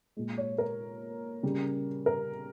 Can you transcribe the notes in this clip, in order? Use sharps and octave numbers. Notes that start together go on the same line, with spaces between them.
A#2 G#3
C#5
A#4
C#3 G3
A#4